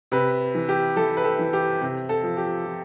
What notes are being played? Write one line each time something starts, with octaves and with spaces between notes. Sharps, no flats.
C3 B4
E3
G4
E3 A4
B4
A4
E3
G4
C3
A4
F3
G4
F3